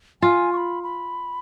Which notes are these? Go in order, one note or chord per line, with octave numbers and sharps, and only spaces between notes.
F4 G#5
C#6
B5
B5